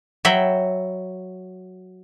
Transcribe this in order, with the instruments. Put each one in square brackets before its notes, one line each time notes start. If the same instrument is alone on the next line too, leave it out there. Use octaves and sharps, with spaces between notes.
[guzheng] F#3 E5 G5 B5